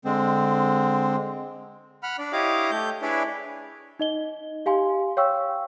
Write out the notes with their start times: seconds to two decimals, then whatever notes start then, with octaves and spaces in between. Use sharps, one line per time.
0.05 D3 G#3 C4
2.03 F#5 B5 F6
2.18 D4 D5
2.33 E4 G4 C#5 D#5 F5 D6
2.71 A3 G6
3.02 D4 E4 G#4 B4 C#5 D5
3.99 D#4 D#5 G7
4.66 G4 F5 G#5 C6
5.17 C#5 F5 G5 C#6 E6